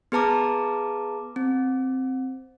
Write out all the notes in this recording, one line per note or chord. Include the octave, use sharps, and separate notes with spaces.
B3 G#4 B4 A5 A#5 D6
C4